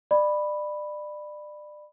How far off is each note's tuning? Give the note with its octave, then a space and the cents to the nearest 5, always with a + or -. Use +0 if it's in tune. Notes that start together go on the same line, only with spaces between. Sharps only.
D5 +30 B5 +0